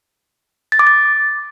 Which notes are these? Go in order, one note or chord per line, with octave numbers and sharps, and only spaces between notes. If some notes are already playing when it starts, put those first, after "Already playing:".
A6
D6
A6